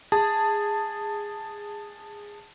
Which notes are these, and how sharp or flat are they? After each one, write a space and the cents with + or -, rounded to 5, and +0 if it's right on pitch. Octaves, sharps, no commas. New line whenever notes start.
G#4 -15 A5 +5